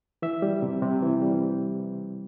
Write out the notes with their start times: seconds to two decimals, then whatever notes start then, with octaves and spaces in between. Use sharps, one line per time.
0.22 E3 E5
0.42 G3
0.62 C3
0.82 C3
1.02 E3
1.22 G3